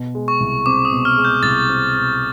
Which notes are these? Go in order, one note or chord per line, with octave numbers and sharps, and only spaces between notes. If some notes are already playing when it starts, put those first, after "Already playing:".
Already playing: B2
G#3
C#6
C2
C4 D6
D#6
B2
F6
G#3
G6
C2 A6
C4
B2